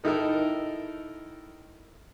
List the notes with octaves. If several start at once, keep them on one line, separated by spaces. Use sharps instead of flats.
D#3 D#4 E4 A4 A#4